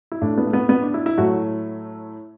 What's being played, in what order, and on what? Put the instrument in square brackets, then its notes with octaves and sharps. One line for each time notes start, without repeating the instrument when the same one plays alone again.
[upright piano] E4
A2 A3 D4
B3
A3
B3
B3
D4
E4
E4
A2 F#3 A3 F#4